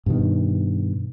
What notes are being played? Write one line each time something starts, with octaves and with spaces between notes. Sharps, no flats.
G2 B2 D#3